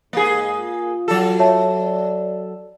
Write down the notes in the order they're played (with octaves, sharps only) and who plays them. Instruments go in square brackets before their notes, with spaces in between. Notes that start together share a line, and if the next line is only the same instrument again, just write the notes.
[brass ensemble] G#2 [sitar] A#3 G#4
[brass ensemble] F4
[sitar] F#3 A4
[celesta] C#5 E5 A5
[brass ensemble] D5